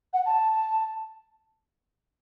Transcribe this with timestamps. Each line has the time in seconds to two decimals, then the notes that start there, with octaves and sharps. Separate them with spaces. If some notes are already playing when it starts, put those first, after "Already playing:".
0.13 F#5
0.26 A5